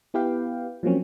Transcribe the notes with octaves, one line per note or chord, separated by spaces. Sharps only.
B3 E4 G4 B4 F5 G5
F3 F#3 A#3 C4 C#4